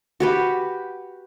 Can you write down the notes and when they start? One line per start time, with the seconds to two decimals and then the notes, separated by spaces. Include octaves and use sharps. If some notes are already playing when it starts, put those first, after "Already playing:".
0.20 F#4 G4 B4